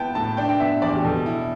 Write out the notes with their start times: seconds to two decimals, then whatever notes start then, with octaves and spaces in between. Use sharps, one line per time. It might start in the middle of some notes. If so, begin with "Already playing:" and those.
Already playing: B3 E4 G5 A5
0.15 A2 A5
0.37 D4 G5
0.49 G5
0.60 B3 E5
0.82 E2 D5
0.96 G4
1.04 B2 A4
1.26 E4